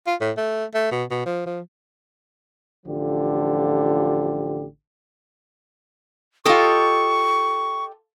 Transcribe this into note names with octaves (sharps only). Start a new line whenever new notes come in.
F4
A2
A3
A3
B2
B2
F3
F3
A1 D3 F3 F4 G4
F4 G4 A4 D#5 C#6 D#6